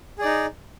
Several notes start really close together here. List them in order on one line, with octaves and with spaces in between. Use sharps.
G#4 D5 D#4